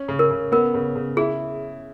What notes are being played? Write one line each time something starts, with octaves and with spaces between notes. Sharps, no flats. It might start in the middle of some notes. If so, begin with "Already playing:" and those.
Already playing: C#4
C#3
A#4
C#3
B3 A#4
C#3
C#3
E4 G#4